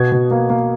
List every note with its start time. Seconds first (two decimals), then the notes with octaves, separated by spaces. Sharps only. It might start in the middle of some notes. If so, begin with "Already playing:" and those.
Already playing: B2 B3 G#6
0.12 B2
0.31 A#3
0.50 A#3